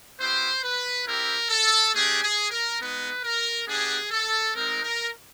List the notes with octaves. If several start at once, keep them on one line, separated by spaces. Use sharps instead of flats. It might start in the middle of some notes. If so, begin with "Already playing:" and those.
B3 E4 G4 C5
B4
C4 E4 G4 A#4
A4
A3 D4 G4 G#4
G#4
A#4
G#3 B3 D#4 B4
A#4
B3 D4 G4 G#4
A4
G#3 C4 D#4 A#4
A#4